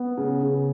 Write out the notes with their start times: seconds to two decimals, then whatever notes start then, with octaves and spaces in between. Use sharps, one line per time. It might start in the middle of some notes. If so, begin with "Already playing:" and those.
Already playing: B3
0.17 C#3
0.43 C#3